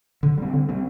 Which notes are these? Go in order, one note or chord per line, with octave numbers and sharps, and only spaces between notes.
D3
G3 C4
D3
G3 C4